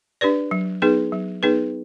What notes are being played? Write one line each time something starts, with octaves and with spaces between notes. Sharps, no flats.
D4 G4 B4 D5
F#3
B3 D#4 G#4 B4
F#3
B3 D#4 G#4 B4